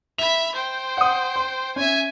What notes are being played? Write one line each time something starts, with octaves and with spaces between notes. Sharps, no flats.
E5 B5 F7
C5 G5
F#5 D#6
C6
C#4 E5 G#5